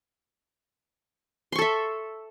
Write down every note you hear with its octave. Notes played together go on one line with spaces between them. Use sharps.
A4 E5 C6 C#6